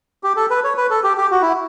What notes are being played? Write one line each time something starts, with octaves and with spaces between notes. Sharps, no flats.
G4
A4
B4
C#5
B4
A4
G4
G4
F#4
E4